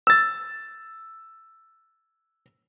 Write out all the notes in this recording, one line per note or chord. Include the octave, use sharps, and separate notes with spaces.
E6 A6